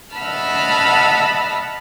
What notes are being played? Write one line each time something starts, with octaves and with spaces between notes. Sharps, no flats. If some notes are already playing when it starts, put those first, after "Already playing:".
D#5 E5 F#5 A5 B5 F6